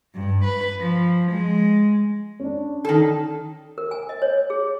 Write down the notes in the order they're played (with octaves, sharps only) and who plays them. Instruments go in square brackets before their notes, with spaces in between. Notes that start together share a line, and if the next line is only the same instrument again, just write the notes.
[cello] G2
B4
F3
G#3
[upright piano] C#4 D4
[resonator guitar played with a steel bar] D#3 A4
[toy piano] A#4
G#5
D#5
C#5
G#4